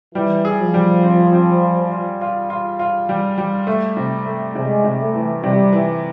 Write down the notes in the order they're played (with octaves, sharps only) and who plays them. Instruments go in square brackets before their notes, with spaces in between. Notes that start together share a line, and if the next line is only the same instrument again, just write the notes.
[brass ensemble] E3 [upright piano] G3
[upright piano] G#4
[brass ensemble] F3
[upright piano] G3
C4
C4
F4
F4
F4
F4
F4
G3
G3
A3
C3
A3
[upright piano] C3 [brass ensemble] G#3
[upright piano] C3
[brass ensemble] A3
[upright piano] E3
[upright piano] C3 [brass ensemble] G3
[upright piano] E3